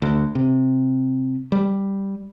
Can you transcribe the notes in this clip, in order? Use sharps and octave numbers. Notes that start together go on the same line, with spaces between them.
D2
C3
G3